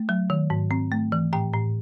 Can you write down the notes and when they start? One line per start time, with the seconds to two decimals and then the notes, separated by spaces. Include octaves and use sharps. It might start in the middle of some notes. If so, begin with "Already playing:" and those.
Already playing: A3
0.09 F#3
0.30 D#3
0.50 G#2
0.71 C4
0.92 A3
1.12 E3
1.33 A2 G5
1.53 A2